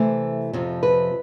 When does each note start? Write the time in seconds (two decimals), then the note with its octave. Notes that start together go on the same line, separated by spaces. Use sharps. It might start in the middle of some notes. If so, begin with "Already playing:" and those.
Already playing: C3 E3 A3 C5
0.53 F2 C3 F3
0.83 B4